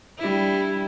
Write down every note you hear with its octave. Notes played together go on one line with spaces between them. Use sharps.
G3 D4 E4